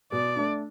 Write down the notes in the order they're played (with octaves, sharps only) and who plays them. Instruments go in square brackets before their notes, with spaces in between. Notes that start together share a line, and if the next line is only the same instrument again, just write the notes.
[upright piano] B2 [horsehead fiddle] D5
[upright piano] A3 D4